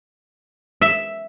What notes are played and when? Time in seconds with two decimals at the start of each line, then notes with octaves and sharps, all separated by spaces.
0.81 E5